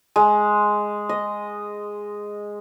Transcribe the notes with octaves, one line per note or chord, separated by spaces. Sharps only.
G#3
D#5